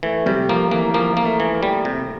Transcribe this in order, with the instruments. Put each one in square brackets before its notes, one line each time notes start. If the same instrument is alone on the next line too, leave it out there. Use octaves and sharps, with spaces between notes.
[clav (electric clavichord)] E3 [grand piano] A3
[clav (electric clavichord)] C3 [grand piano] G3
[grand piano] F3 [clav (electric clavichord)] A#3
[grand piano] E3 [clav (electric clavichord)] A#3
[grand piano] F3 [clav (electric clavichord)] A#3
[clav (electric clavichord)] A#3
[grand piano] A3
[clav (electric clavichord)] E3
[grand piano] A#3
[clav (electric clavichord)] G3
C3